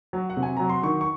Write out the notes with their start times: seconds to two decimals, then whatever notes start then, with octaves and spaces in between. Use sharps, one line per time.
0.13 F#3
0.30 F#5
0.37 C3
0.43 G#5
0.57 F#3 A#5
0.69 C6
0.83 D#3 C#6
1.01 C#6